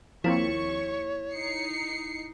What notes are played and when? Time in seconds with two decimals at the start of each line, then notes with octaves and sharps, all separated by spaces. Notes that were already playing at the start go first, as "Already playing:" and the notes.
0.24 D#2 F3 A#3 C4 E4 C#5 C#6
1.33 D#4 C7 C#7